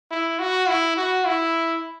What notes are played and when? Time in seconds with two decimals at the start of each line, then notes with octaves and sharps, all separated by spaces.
0.11 E4
0.39 F#4
0.68 E4
0.97 F#4
1.25 E4